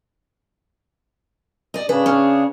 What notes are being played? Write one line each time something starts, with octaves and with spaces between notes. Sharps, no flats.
D5 D#5
C#3 D4 G#4 B4
C#4